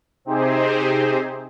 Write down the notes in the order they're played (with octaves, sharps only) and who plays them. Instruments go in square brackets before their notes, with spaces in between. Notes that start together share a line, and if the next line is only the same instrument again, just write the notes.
[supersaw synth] C3 C4 D#4 G4 G#4 C5